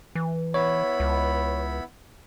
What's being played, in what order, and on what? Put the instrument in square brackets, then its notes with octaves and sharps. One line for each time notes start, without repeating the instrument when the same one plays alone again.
[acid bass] E3
[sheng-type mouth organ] B3 E4 B5 [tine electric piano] C#5
[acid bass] C#2